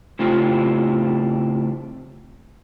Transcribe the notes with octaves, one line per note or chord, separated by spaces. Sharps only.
A2 C#3 A3 C4 F4 G4